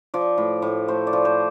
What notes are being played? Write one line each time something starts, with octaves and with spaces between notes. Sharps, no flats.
F3 D5
A2
A2
A3 C5
D5
F3
C5